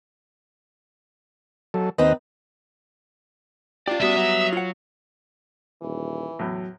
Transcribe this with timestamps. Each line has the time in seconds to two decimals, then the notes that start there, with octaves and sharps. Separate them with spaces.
1.74 F#3 A4
1.98 D#2 C4 D#4 B4 D#5
3.88 C#4 F4 G4 D5
4.02 G3 B3 F#4 E5 D#6
4.16 F#3
4.53 F4 F#5
5.82 D#1 E3
6.39 E2 A2 F#3